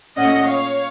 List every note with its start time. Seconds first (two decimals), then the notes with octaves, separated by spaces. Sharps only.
0.17 A#2 A3 C#4 D#5 F#5
0.45 C#5 F5